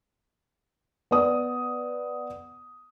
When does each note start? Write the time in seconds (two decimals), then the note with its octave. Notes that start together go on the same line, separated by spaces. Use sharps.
1.11 B3 D5 D#6